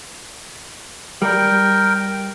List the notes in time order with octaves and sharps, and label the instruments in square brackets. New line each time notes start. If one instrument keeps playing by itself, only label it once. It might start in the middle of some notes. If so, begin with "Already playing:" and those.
[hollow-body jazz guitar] G3 [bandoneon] A#4 G5